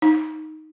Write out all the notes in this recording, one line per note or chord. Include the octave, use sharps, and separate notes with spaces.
D#4